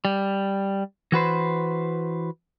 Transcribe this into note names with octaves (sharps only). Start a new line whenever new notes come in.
G3
E3 F#4 B4 C5